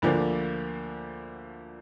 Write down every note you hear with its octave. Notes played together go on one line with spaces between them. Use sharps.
D2 D3 F3 A#3 D4